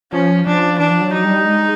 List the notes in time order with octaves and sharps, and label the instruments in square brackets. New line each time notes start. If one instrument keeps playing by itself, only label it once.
[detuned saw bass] F3 [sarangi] C#4
[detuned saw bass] F3 [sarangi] D4
[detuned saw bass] E3 [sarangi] D4
[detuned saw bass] F3
F#3
[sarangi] D#4
[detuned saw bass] G3
G#3